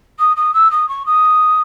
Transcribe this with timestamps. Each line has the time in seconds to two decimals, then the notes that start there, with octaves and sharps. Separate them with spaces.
0.19 D#6
0.36 D#6
0.54 E6
0.71 D#6
0.88 C#6
1.06 D#6